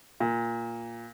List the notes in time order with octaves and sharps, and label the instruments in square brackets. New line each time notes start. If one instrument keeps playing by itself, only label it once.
[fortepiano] A#2